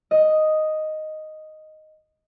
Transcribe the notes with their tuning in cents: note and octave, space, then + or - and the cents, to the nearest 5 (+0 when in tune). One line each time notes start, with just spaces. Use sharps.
D#5 +0